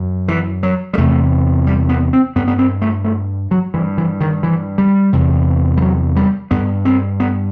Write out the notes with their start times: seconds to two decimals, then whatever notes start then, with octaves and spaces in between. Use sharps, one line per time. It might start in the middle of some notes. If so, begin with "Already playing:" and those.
Already playing: F#2
0.28 E3
0.63 F#3
0.93 G3
0.97 E2 C3 A3
1.67 G3
1.89 B3
2.13 C4
2.35 G2 B3
2.48 B3
2.58 C4
2.82 A3
3.04 A3
3.51 F#3
3.74 G2 E3
3.98 E3
4.21 D#3
4.43 E3
4.78 G3
5.13 E2 C3
5.77 G3
5.81 F#3
6.16 G3
6.51 G2 B3
6.85 C4
7.20 B3